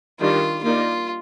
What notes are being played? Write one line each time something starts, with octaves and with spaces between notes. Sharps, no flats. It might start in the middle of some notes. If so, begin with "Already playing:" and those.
D#3 G3 D4 F4
A#3 D#4 F4 A#4 D5